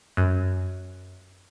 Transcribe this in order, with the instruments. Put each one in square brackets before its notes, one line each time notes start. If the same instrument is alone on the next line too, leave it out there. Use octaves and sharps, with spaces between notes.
[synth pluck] F#2